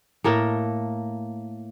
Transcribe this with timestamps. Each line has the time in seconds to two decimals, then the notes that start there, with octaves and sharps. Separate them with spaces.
0.24 A2 A#3 A4 A#4